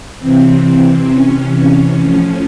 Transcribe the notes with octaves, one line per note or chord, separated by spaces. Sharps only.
C3 E3 C4
C#4
C#4
A2 F3